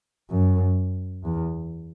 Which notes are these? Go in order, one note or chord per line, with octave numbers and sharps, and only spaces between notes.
F#2
E2